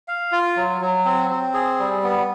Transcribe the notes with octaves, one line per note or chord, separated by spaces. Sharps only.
F5
F4
F#3
F#3
C4
C4
G#4
G3
B3